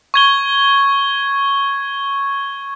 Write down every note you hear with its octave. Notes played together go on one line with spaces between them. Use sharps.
C#6 G#6 G7